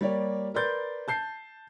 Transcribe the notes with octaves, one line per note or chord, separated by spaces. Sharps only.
G3 A#3 G4 C#5 D5
A#4 B4 D5 C6 G6 A6
A5 G6 C7